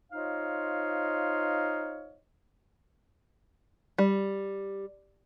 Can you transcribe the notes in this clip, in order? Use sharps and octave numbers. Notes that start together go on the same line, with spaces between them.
D#4 F4 C5 C#5 D#5 F5
G3